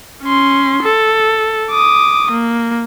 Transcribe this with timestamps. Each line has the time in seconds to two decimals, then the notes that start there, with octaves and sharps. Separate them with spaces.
0.23 C#4 C6
0.83 A4
1.71 D6 D#6
2.31 A#3